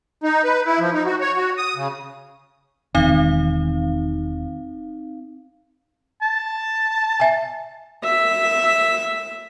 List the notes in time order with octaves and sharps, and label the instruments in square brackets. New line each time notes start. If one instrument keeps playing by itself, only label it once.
[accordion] D#4
B4
E4
F3
D#4
F#4
C#5
F#4
D#6
C#3
[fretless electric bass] E1 D#3 [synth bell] C4 D#4 F5
[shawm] A5
[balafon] E5 G#5
[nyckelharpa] E5